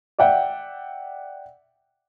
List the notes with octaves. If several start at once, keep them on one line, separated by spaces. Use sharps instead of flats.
D5 E5 F#5 G5